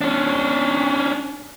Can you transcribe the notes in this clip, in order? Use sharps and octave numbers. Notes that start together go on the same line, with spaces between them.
C#4 D4